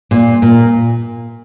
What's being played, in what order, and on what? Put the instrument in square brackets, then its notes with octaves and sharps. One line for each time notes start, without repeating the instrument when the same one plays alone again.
[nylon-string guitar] A#2
A#2